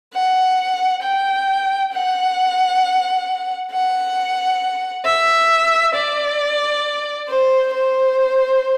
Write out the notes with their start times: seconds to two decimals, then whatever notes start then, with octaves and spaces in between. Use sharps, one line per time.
0.14 F#5
1.02 G5
1.93 F#5
3.71 F#5
5.05 E5
5.95 D5
7.28 C5
7.74 C5